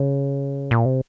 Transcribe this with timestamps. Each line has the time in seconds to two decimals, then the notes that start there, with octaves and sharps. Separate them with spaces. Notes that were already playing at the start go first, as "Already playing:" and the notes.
Already playing: C#3
0.71 A#2
0.85 C3